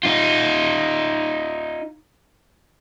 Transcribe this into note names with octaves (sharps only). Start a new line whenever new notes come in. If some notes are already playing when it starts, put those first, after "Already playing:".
D#4 F4